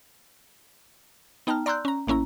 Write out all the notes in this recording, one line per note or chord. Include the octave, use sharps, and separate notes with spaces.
B3 D#4 G5 A5 A#5 F6
D5 A#5 C6 E6 F#6 G6
C#4 A#5
A1 A#3 C#4 E4 A#5